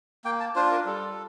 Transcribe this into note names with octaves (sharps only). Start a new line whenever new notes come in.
A#3 G5
A5
D4 F4 C5
A#4
G3 A4